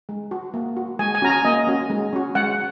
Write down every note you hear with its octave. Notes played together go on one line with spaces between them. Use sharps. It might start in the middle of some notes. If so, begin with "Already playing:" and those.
G#3
F#4
A#3
F#4
G#3 G#5
G#5
C#4 F#4 A#5
G#5
A#3 D#5
C#4 F#4
G#3
C#4 F#4
G#3 F#5